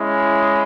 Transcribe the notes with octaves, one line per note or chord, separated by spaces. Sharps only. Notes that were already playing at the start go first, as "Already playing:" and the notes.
Already playing: G#3 C#4 E4